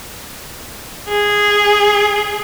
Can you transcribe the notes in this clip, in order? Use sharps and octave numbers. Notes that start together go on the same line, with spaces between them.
G#4